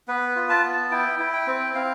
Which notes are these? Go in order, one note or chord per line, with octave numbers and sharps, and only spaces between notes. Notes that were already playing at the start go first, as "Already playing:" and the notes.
B3 B4
F4
A5
B3
E4 G5
E4
G5
C4
C4 F5